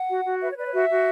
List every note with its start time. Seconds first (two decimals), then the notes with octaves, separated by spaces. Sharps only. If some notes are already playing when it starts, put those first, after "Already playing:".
Already playing: F#5
0.09 F#4
0.25 F#4
0.41 B4 E5
0.49 C#5
0.57 B4 D5
0.66 C#5
0.74 F#4 E5
0.90 F#4